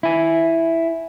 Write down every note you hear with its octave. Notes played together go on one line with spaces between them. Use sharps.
E4 G#5